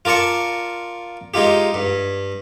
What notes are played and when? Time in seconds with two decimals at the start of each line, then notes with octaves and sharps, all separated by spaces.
0.05 F4 A#4 D5 A5 C#6
1.34 G#3 D#4 F4 G4
1.74 G2